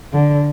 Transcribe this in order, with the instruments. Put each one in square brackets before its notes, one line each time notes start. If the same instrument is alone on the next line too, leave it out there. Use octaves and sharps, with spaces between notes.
[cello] D3